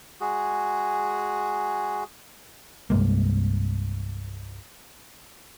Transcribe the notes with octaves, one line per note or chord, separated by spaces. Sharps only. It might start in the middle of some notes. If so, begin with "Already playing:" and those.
G#3 F#4 G#4
C2 G2 G#3 A#3